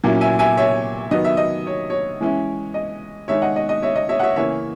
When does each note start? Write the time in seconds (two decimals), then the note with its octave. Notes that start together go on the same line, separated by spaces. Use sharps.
0.04 A#2 F#3 A#3 C#4 E4
0.21 E5 G#5
0.39 E5 G#5
0.57 C#5 E5
1.11 D#3 F#3 B3 D#5
1.24 E5
1.37 D#5
1.67 C#5
1.90 C#5
2.20 E3 G#3 C#4 E4
2.74 D#5
3.28 D#3 G#3 D#4 C#5 E5
3.42 D#5 F#5
3.56 D#5
3.69 D#5
3.82 C#5 E5
3.96 D#5
4.09 C#5 E5
4.19 F#5
4.23 C#5 E5
4.36 C#3 E3 A#3 C#4 C#5 E5